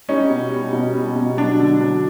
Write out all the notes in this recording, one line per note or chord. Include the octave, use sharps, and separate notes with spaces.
G3 C#4 D#4
B2
G3
B2
G3
B2
F#3 D4
D3
F#3